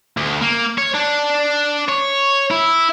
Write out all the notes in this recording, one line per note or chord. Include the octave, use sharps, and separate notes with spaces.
D2
A#3
C#5
D4
C#5
E4